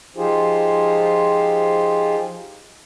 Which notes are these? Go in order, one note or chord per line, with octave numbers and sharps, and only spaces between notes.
F3 D#4 F4 G4 G#4 C5